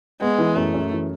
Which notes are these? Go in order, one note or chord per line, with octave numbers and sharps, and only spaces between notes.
G#3 B3
E3
F#2 A3
F#2
E3